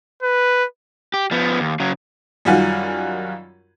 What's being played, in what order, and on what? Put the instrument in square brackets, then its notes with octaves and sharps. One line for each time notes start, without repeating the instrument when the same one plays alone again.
[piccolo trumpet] B4
[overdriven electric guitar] G4
F3 B3
D#2
C#3 F#3
[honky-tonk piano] F#2 D#3 G3 F4 F#4 G#5